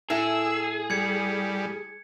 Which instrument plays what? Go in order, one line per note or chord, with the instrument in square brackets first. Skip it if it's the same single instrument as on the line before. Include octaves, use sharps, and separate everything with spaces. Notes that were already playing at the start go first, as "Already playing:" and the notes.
[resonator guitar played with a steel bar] A2 E4 A4 [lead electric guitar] G#4 [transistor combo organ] E6
[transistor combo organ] G3 [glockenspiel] G#6 C#7